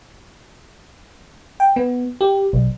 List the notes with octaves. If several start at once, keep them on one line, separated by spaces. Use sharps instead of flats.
G5
B3
G4
B1